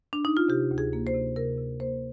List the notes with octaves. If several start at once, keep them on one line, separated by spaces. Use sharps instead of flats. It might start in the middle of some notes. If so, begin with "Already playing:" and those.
D4
D#4
F4
C3 G4
D2
G#4
A#3
C5
C3
C3 A#4
C3
A#3 C5